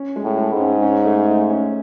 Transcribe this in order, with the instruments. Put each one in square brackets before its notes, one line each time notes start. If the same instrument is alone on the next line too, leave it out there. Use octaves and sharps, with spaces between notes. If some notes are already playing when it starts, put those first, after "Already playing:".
Already playing: [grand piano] C#4
G#3
[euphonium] A2
[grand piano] G#3
[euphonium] G#2
[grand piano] C#4
C#4
A3
A3
C#4